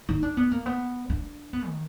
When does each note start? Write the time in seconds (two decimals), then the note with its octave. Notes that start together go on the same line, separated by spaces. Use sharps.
0.09 D#4
0.23 D4
0.37 B3
0.52 A#3
0.66 B3
1.10 D4
1.53 B3
1.67 D#3